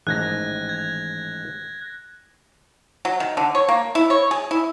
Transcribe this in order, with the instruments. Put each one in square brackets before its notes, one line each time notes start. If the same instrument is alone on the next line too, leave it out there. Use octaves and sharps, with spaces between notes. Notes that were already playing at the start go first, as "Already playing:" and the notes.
[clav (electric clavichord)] A1 G#2 D#3 [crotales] F#6 G#6 A#6
[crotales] G#6
[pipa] F#3
D#3
D3
C#5
A#3
E4
C#5
G#4
E4